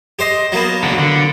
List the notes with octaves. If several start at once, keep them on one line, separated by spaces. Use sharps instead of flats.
G4 C5 D#5
F#3 A#3 B3
F#4 A4
D3